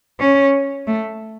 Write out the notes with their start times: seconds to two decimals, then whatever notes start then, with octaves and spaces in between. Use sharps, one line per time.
0.20 C#4
0.87 A3